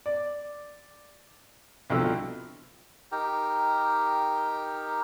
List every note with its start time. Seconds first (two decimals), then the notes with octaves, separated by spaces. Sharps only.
0.06 D5
1.90 C2 B2 D3 F3 E6
3.12 D#4 G4 A#4 G5